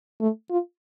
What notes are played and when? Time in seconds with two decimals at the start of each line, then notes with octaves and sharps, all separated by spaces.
0.20 A3
0.50 F4